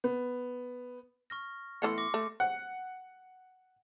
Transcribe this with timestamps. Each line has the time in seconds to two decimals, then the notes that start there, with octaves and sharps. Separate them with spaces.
0.04 B3
1.30 C#6 F6 A#6
1.82 E3 A3 B3 C6 C7 C#7
1.98 D6 A#6
2.14 A3
2.40 F#5